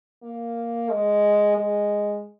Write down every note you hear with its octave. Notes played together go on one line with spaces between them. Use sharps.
A#3
G#3
G#3